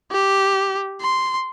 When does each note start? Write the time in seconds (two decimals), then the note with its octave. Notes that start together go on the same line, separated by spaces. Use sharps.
0.11 G4
1.01 C6